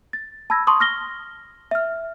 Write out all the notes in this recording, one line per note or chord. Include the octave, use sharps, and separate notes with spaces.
A6
A5 B5 E6 G#6 A#6
A5 C6 C#6 D#6
F6 A#6 G7
E5 F6